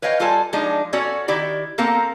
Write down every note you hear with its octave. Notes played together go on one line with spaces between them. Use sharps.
B4 C#5 D#5 F5 G5
G3 F4 A4 G#5 A5
F3 G#3 D4 D#4
C#4 F#4 A4 C#5 D5
D#3 E4 G4 D5
A#3 C4 A4 A#4 F5